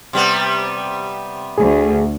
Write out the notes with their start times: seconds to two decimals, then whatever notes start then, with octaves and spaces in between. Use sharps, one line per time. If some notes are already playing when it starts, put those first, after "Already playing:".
0.13 C3 G3 B3
1.58 D2 A3 G#4